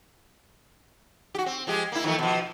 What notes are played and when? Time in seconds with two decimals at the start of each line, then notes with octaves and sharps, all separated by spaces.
1.35 F#4 G4
1.46 C4
1.67 F3 G#3 G4
1.92 A#3 E4
2.04 D#3 F3 A3
2.19 B2 F3